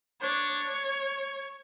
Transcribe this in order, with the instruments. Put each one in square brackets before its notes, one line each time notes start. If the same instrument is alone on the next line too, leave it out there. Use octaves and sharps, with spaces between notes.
[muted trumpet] D4 [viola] C#5